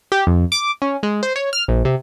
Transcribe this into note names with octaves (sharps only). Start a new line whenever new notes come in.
G4
F2
D6
C#4
G#3
C5
C#5
F6
A#1
C3